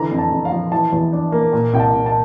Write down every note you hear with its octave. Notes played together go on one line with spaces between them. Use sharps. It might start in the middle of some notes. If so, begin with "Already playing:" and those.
Already playing: D3 E3 A#5
F2
A5
F2
F5
F3
E3 A5
E2
D4
A#3
A#2
C2 G5
A5
C2
A5